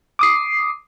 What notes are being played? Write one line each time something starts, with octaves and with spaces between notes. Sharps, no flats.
D6 D#6 C7